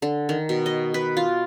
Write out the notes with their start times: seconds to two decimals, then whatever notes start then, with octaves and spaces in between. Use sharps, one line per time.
0.02 D3
0.29 D#3
0.49 B2
0.66 D#5
0.94 B4
1.17 F4